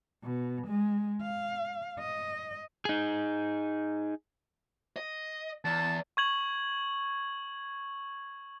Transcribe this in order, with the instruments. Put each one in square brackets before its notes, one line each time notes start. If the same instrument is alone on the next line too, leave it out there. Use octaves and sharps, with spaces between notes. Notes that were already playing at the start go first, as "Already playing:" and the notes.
[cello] B2
G#3
F5
D#5
[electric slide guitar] D#4 G#4
[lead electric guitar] D#5
[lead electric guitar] E2 [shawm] A5
[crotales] C#6 G#6 F#7